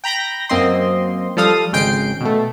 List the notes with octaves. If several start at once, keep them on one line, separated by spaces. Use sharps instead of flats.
G5 A#5 B5 G6 A#6
F#2 A#3 C4 D#5 C6
F3 G3 A4 F5 D#6
G#1 C#3 G#3 G5 C7 D7
B2 A3